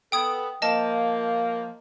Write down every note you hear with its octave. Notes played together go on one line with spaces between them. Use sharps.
B3 A4 G5 D#6 G#6
F3 A#3 D#5 A5